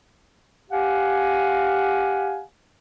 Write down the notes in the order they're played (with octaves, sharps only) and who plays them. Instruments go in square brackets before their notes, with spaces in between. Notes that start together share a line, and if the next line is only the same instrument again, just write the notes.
[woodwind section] G4 F5 F#5 G#5